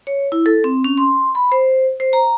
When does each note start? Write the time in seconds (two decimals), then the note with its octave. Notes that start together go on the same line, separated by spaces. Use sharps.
0.07 C#5
0.32 E4
0.46 A4
0.64 C4
0.84 C#4
0.97 C6
1.35 B5
1.52 C5
2.00 C5
2.13 A#5